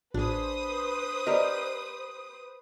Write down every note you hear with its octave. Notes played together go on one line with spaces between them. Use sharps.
A1 D4 G#4 B4 C5 D#6
G4 A#4 D5 D#5